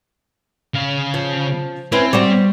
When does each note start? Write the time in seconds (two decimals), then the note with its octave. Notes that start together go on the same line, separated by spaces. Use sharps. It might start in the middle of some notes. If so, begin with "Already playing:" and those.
0.74 C#3 F5
1.14 F3
1.92 C4 C#4 E4 B4
2.13 G3 F#4 C5